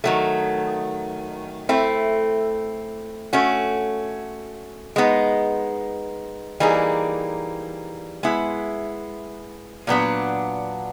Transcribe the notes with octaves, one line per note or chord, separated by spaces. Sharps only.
D#3 F#3 A3
A3 C4 E4
A3 C#4 F#4
G#3 B3 D#4
E3 G3 A#3 D#4 G#4
G#3 B3 E4
A#2 F#3 B3 D4